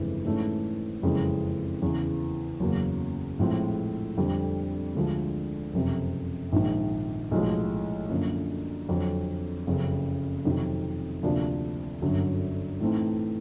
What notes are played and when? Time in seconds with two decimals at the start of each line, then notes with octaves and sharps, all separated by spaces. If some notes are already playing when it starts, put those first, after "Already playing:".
Already playing: G1 F2 C#3 E3 G#3
0.25 G#2 E3 A3 C#4 E4
1.02 F#1 F2 C#3 E3 G#3
1.82 E2 C#3 E3
2.59 F#1 E2 C#3 F#3 A#3
3.39 A#1 A2 F3 G#3 C4
4.17 F2 D3 G3
4.95 D2 D3 F3 G#3
5.74 F#1 F2 C3
6.53 A#1 G#2 D#3
7.31 B1 A2 F3 G#3
8.09 F#2 D3 F3 A#3
8.89 F2 D3 F#3
9.67 F#1 F2 C#3
10.45 F2 C3 D#3 F#3
11.23 D2 C3 F3 A#3 D4
12.02 G1 F#2 D3 F#3
12.80 A2 E3 A3 C4 D#4